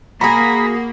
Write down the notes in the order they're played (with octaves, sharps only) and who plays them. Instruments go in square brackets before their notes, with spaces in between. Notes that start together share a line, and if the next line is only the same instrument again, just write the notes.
[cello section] A#3 [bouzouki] F#4 G#4 [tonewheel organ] A#5 B5